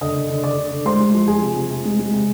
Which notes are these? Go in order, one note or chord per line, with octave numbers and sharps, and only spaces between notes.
D3 D#5 D#6
D3
D3
D3 D5 D6
D3
D3
G#3 C5 C6
G#3
F3
F3 G#4 G#5
C3
C3
C3
G#3
G#3
C3